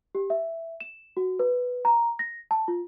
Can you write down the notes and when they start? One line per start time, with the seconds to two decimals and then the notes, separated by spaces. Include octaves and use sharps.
0.15 G4
0.30 E5
0.80 E7
1.17 F#4
1.39 B4
1.85 A#5
2.19 A#6
2.51 A5
2.68 F4